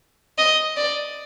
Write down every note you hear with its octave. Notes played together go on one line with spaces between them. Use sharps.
D#5
D5